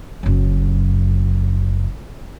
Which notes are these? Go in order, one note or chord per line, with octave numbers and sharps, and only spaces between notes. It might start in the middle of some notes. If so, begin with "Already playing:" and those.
F#1 F#2